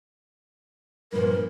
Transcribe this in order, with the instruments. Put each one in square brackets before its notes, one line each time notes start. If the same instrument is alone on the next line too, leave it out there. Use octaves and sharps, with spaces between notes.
[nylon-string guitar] G2 A#2 F3 [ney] A#4